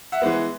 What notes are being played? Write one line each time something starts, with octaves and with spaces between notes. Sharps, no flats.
E5 F#5
E3 G#3 B3